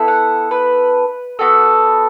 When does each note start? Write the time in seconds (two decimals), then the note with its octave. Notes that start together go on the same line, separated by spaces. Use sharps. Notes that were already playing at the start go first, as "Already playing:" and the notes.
Already playing: B3 E4 A4
0.08 F#5
0.51 B4
1.39 B3 F#4 A4